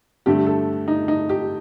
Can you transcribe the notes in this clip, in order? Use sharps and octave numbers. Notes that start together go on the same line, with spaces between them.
G2 D3 A3 G4
A4
D#4
D#4
G4